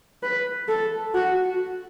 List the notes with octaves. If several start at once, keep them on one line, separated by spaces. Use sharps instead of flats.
B4
A4
F#4